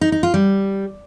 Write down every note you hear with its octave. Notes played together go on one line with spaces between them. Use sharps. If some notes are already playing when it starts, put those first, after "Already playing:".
D#4
D#4
F4
G3